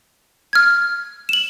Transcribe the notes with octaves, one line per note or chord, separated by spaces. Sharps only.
F6 G#6
E7 F#7